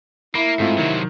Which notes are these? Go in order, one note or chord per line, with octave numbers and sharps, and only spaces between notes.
A#3 E4 B5
G#2 A3 C4 F4
C3 D#3 F#3